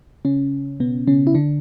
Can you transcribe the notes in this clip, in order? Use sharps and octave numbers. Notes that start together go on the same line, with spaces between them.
C#3 C#4
B2 B3
C#3 C#4
E4
D3 D4